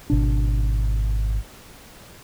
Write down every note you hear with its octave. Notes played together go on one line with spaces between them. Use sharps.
G#1 B2 D4